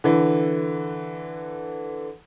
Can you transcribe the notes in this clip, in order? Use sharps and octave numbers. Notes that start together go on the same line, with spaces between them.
D3 E3